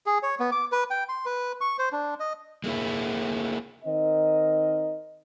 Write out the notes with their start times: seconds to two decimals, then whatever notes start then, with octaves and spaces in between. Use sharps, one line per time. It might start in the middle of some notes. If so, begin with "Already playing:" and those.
0.06 G#4
0.23 C#5
0.40 B3
0.52 D6
0.72 B4
0.91 G5
1.09 C6
1.26 B4
1.61 C#6
1.79 C5
1.92 D4
2.20 D#5
2.64 G#3 A#3 E4
3.85 D#3 C4 D#4 A#4 D#5